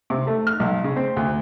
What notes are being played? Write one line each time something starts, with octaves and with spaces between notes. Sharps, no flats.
C3
A3
F6
B1
C#3
C4
D2